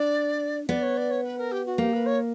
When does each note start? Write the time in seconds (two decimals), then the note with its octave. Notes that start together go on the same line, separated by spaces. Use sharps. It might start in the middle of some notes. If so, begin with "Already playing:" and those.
Already playing: D4 D5
0.68 B3 D5
0.82 C#5
0.97 D5
1.10 C#5
1.23 B4
1.38 A#4
1.51 G4
1.65 F#4
1.78 A#3 G4
1.93 B4
2.06 C#5